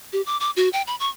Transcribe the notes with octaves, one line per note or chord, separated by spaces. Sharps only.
G4
D6
D6
F#4
G5
B5
C#6